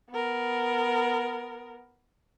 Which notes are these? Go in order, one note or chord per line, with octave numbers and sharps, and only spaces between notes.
B3 A#4